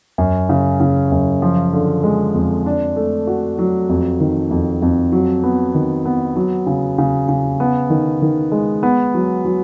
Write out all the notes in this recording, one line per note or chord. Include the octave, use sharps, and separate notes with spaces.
F#2
C#3
C#3
F#2
F3
D3
G#3
F2
D4
A3
F#4
F#3
F2
D#3
F2
F2
F#3
B3
D#3
B3
F#3
C#3
C#3
C#3
B3
D#3
D#3
G#3
B3
F#3
F#3